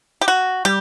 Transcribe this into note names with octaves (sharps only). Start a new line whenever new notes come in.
G4
F#4
G3 G4